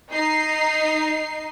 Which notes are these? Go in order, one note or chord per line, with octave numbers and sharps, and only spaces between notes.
D#4 C7